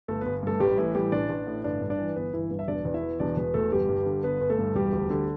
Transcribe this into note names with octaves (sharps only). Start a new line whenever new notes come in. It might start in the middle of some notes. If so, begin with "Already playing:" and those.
G1 A3 A4
G1 B3 B4
G2 A3 A4
A1 G3 G4
A2 E3 E4
E3 G3 G4
A1 D4 D5
A1
A2
G1 D4 D5
G2
D4 D5
E3
G1 B3 B4
G1 E3 E4
G2
E5
E1 D4 D5
E2 D5
E4 E5
E3
E1 D4 D5
E1 B3 B4
E2 A3 A4
G1 G3 G4
G2
D3
G1 B3 B4
G1
A3 A4
G2
E1 G3 G4
D2
D3